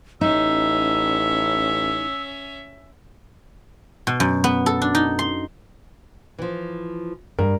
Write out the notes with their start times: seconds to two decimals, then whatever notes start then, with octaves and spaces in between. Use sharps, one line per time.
0.21 A1 C#4 D#4 E5 E6
4.07 B2
4.20 F#2
4.44 B3
4.66 A4
4.82 D4
4.95 D#4
5.19 C6
6.38 E3 F3
7.39 G2 A#4